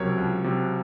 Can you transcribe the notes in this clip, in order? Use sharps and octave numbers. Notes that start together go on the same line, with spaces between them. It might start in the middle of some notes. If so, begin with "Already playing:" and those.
Already playing: C#2 C3 F#3 A#4 C#5
C#2
C3 F#3